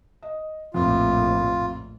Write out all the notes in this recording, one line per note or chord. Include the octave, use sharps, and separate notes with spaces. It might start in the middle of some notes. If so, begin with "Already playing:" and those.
D#5
A#1 F2 A2 F4